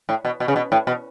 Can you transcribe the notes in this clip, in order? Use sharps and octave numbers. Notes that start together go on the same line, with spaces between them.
A2
B2
B2
C#3
B2
A2
B2